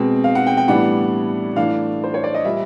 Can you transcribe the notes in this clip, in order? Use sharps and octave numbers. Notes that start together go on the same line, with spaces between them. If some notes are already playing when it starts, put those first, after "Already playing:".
Already playing: B2 G#3 C4
F5
F#5
G5
G5
A2 E3 G3 B3 D4 F#5
A2 E3 A3 D4 F5
C5
C#5
D5
D#5
A#2 G3 E5